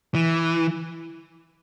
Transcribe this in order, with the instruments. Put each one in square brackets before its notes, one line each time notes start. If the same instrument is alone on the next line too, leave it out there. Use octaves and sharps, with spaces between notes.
[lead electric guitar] E3